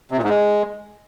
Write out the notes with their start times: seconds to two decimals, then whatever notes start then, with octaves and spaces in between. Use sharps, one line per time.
0.11 C3
0.17 A#2
0.23 G#2
0.29 G#3